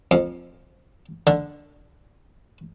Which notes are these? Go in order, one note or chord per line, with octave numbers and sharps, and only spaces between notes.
F2
D3